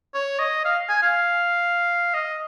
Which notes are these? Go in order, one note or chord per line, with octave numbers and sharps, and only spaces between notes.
C#5
D#5
F5
G#5
F5
D#5